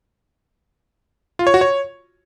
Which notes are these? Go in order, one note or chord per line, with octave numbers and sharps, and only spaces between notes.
F4
C#5
F#4
C#5